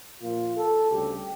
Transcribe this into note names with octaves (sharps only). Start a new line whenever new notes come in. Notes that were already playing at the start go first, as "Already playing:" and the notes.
A#2 F3 A#3 F4
A4
D2 C#3 G3 G4